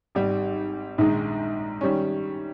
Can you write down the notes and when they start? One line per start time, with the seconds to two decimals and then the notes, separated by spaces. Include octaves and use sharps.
0.15 G#1 G#2 G3
0.98 A#1 G#2 D#3 G#3 D#4
1.81 D#3 G3 C#4